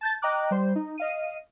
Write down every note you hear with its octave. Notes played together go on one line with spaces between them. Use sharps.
A5 G6 A6
D#5 G5 A#5 D6 F#6
G3 C5
D#4
D#5 F5 D#7